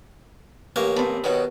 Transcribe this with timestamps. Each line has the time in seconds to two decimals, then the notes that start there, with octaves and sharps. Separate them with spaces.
0.76 A1 A#3 G4 A#4 B4 C#5
0.96 B3 C4 A5
1.24 B2 D#3 C4 C#5 F#5